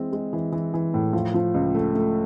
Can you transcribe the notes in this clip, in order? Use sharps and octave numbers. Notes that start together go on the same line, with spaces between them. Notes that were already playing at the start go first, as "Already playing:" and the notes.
Already playing: E3 G#3 C4
G#3
E3
E3
E3
A2
F3
F3
C#2
A3
A3